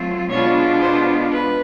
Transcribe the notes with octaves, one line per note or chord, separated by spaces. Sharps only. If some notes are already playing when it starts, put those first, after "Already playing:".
Already playing: F#3 A3 C4 F4
B2 G#3 B3 D4 F4 C#5
C5
B4